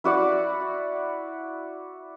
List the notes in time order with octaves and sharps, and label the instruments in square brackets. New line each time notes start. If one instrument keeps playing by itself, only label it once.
[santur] E4 F#4 D5 F#5